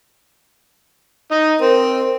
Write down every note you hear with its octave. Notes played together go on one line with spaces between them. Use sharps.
D#4 D#5
C4 A#4